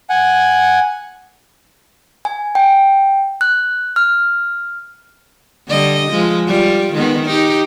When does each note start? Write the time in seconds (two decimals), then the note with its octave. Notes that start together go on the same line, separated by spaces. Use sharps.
0.09 F#5 G#5
2.25 G#5
2.55 G5
3.41 F#6
3.96 F6
5.68 D3 G3 D#5
6.10 F3 G#3
6.47 G3 F4
6.93 D#3 G#3 B3
7.26 D#4 G4